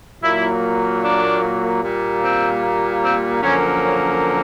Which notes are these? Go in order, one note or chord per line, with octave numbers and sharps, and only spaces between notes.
A#2 F#3 A#3 E4
D4
A#2 G3 A#3
C4
C4
F#2 D3 F3 A#3 C#4
C#4